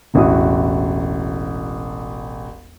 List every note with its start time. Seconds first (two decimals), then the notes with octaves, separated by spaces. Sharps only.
0.14 E1 A1 E4 F#4 D#6